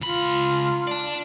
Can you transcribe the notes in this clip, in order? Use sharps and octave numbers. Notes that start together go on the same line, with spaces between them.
C#2 F4 B5
D5 A5